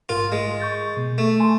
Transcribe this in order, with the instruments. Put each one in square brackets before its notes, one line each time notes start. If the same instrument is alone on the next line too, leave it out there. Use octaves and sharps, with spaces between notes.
[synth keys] A1 G#2 A#4 [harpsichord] F4
[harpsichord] G#3
[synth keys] C#6 G6 A6
B2
[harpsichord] A3
[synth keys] G#5 A5 C6